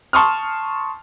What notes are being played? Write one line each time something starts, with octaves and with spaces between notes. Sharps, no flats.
A5 C6 C#6 D#6 F6